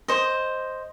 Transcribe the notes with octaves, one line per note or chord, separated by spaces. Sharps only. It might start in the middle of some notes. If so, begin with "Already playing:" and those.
C5 D#5